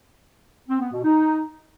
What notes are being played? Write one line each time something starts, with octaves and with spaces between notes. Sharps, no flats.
C4
B3
B2
D#4